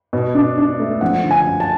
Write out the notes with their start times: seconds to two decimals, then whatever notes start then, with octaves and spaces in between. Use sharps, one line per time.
0.13 B2
0.35 D4
0.58 D4
0.79 A3
1.01 F3 F#5
1.23 D3
1.31 G#5
1.46 F#2
1.60 A5